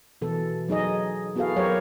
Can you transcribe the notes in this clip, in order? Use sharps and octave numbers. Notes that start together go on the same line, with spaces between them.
B2 E3 A4
F#3 D#4 G#4 D#5
B3 E4 F#4 G#4 A4 F5
F#3 G4 A#4 C5 C#5